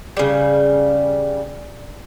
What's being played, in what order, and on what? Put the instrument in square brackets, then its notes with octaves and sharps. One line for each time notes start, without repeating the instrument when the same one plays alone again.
[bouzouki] C#3 G3